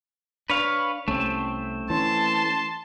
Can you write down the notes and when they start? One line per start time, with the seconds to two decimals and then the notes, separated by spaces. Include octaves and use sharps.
0.50 D4 B4 C#5 F5
1.08 C2 A3 C4 C#4
1.90 E3 C#4 A5 C6